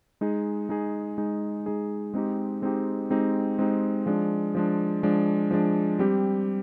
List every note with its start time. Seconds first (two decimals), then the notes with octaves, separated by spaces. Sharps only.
0.21 G#3 D#4 G#4
0.69 G#3 D#4 G#4
1.18 G#3 D#4 G#4
1.66 G#3 D#4 G#4
2.14 G#3 C4 D#4 G4
2.62 G#3 C4 D#4 G4
3.10 G#3 C4 D#4 G4
3.59 G#3 C4 D#4 G4
4.06 F3 G#3 D4
4.55 F3 G#3 D4
5.03 F3 G#3 D4
5.51 F3 G#3 D4
5.99 G3 C4 G4